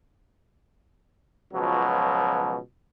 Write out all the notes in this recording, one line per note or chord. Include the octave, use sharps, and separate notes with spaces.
C#2 B2 F3 F#3